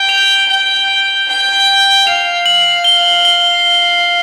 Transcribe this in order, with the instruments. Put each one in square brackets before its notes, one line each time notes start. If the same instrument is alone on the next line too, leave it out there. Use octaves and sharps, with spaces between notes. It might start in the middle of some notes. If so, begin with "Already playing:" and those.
Already playing: [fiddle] G5
[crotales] F7
[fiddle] G5
G5
[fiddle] F5 [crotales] F7
[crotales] F#7
G7
G7